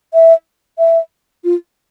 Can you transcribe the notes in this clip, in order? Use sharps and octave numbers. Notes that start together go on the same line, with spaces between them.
E5
E5
F4